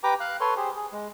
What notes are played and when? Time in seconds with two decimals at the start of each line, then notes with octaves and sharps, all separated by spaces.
0.03 G4 B4 G5 A#5 D6
0.20 F5 F#6
0.40 A4 B4 C#5 C6
0.57 G4 G#4 C5
0.76 G#4
0.92 G#3